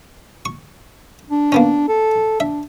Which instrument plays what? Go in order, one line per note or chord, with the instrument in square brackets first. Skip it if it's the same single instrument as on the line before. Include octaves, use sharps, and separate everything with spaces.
[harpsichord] C#6
[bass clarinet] D4
[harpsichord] A#3 B3 C#4
[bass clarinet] A4
[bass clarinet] D4 [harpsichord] E5